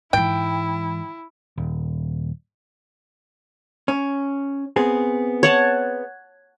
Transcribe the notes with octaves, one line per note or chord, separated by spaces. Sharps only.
G#2 E3 E4 G5
D#1
C#4
B3 C4 G#4
C#5 F#5 A5